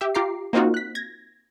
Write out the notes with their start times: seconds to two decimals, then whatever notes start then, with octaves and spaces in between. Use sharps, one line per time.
0.01 G4 E5
0.15 F4 G4 A#5 D6 C7
0.53 A#3 C4 D#4 F4 F#4
0.74 F#6 B6
0.95 G#6 A#6